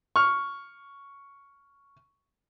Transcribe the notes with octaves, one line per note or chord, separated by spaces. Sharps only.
C#6 F6